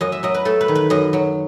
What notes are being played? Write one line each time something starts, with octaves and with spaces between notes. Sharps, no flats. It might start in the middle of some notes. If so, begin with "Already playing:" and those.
F#2 D#5
E5
F#3 D#5
B4
A3 A4
B4
D#3
B4
F#2 D#5
F#3